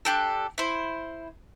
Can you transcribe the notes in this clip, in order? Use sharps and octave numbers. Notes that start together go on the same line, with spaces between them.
D4 G4 A4
E4 C5